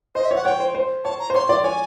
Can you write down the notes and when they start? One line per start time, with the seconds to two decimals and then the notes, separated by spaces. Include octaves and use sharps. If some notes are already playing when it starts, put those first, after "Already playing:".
0.15 C5 D#5
0.25 E5
0.31 C#5 F#5
0.45 C#5 G5
0.60 C5
0.75 C5
1.04 C#5 A5
1.19 A#5
1.30 C5
1.35 C#5 C6
1.49 D5
1.64 C#5 G#5